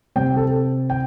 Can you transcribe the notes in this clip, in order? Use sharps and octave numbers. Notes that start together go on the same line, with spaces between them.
C3 G3 C4 G5
A4
G5